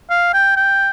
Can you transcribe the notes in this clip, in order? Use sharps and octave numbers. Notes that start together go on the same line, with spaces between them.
F5
G5
G5